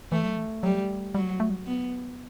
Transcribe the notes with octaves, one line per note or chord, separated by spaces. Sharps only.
E3 A3
F#3
E3
F#3 G3
F#3 G3
A3
G3
B3